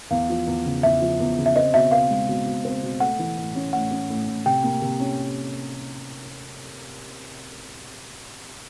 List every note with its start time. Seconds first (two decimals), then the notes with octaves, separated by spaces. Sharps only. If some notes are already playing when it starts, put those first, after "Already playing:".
0.10 E2 F5
0.29 F3
0.47 E2
0.65 C#3
0.83 E2 E5
1.01 F3
1.20 E2
1.38 C#3
1.46 E5
1.56 C4 D#5
1.74 B2 E5
1.92 C4 F5
2.10 G#3
2.29 B2
2.46 B2
2.65 C4
2.83 B2
3.00 A3 F#5
3.19 E3
3.37 A2
3.55 C#4
3.73 A2 F#5
3.91 C#4
4.10 A2
4.28 A2
4.45 C3 G5
4.64 A#3
4.82 C3
5.00 C#4